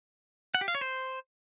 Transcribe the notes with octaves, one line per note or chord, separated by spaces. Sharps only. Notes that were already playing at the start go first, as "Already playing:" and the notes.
F#5
G4
F5
C#5
C5